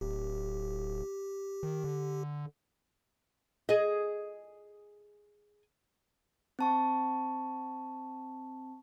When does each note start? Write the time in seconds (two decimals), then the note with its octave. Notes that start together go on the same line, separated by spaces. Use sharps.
0.01 D1 G4
1.63 D#3
1.84 D3
3.69 G#4 D#5
6.59 C4 A5 C#6